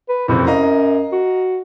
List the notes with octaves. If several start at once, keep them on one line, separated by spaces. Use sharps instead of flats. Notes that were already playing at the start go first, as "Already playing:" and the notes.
B4
F#1 F2 C3 E4
F#2 D#5 F5 A#5
F#4